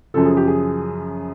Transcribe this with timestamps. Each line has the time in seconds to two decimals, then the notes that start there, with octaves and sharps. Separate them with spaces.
0.14 F#2 C#3 F3 A4
0.25 G#4
0.37 G4
0.47 G#4